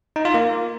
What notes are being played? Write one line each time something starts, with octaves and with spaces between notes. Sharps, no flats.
D#4
F4
A#3